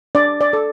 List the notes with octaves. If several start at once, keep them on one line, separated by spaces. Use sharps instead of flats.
D4 D5
D5
A4